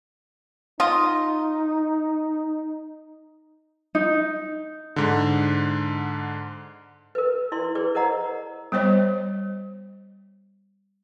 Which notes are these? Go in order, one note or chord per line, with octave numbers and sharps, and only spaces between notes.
D#4 F4 D#5
D#4
G#2 D3
A#4 B4
E4 D5 C6
G#4 B4 D5
A#4 C5 D#5 F#5 A#5
G3 B3 C5 C#5 D#5